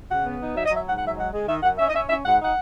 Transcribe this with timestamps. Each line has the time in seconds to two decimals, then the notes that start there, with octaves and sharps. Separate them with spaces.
0.09 C#3 F#5
0.25 B3
0.40 D#4
0.55 F#3 E5
0.66 D#5
0.70 F#3 E5
0.86 G#2 F#5
0.97 F#5
1.01 F#3
1.07 E5
1.17 G#3 F#5
1.32 G#3
1.47 D#3 E5
1.63 F#2 F#5
1.79 C#4 E5
1.88 D#5
1.94 C#4 E5
2.09 C#4 E5
2.25 G#2 F#5
2.40 D#4 F#5